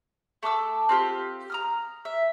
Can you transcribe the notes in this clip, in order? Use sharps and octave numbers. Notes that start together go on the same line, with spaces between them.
A3 A5 D6 E6
C4 F4 G4
A#5 D#6 F6
E5